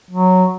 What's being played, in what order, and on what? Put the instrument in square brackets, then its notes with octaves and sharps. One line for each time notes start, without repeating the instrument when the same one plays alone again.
[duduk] F#3